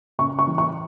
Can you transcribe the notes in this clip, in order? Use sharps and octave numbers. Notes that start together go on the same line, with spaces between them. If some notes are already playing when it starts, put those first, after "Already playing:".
C#3 C#6
C#6
E3
C#6